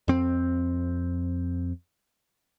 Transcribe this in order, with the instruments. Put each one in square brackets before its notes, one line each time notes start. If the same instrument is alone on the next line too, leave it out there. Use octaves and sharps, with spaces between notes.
[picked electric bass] F2 C4